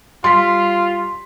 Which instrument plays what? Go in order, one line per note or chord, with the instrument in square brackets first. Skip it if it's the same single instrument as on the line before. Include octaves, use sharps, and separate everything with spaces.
[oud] G3 [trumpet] F4 [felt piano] C6 B6